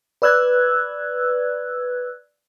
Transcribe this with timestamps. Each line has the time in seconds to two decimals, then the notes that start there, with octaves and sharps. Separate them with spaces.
0.22 B4 D5 E6 F#6 G#6